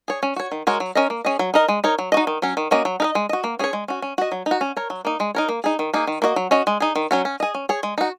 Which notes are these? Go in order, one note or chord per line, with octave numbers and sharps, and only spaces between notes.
G#4 C#5
C#4
F#4 C#5
D#3
G#3 F#4 A#4 C#5
F#3
C#4 A#4 D#5
A#3
C#4 G#4 D#5
F#3
D#4 A#4 D#5
G#3
D#4 A#4 C#5
F#3
D#4 F#4 D#5
D#3
F#3 C#4
D#3
A#3 C#4 F#4 D#5
F#3
D#4 A#4 D#5
G#3
F#4 D#5
A#3
C#4 G#4 C#5
G#3
C#4 F#4
C#4
F#4 D#5
F#3
D#4
F#4
C#4
A#4 C#5
F#3
A#3 D#4
G#3
D#4 A#4 C#5
A#3
D#4 G#4
D#3
A#3 D#4 G#4
D#3
A#3 F#4 D#5
F#3
C#4 F#4 D#5
G#3
D#4 G#4
D#3
F#3 C#4 F#4
C#4
G#4 D#5
C#4
G#4 C#5
G#3
D#4 F#4